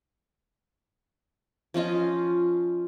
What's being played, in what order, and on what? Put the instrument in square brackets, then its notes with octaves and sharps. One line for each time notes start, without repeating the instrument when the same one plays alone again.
[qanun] F3 C#4 F4 D#5